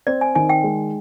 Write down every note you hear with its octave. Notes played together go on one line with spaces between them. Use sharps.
C4 D5
G#5
D#3 G#5
G5
G#3